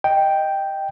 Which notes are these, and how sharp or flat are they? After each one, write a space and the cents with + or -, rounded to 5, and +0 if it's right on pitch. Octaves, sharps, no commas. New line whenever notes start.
D#5 +0 G5 +0